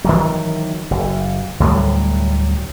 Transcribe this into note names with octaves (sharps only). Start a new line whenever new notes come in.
D#3 E3 F#3
F#1
D2 A2 F#3 G3